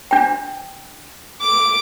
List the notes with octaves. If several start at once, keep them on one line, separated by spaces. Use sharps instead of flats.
D4 G5
D6